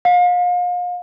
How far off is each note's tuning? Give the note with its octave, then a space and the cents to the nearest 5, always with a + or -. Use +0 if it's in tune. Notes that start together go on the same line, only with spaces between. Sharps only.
F5 +35